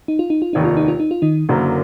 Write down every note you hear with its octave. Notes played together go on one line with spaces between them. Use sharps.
D#4
F4
D#4
F4
F1 D#2 D#3 D#4
F4
D#4
F4
D#4
F4
D#3 D#4
F#1 F#2 D3 F#3 A#3